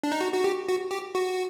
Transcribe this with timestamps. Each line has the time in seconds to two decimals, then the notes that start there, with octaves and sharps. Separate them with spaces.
0.03 D4
0.12 D#4
0.21 F#4
0.33 F#4
0.44 G4
0.68 F#4
0.91 G4
1.15 F#4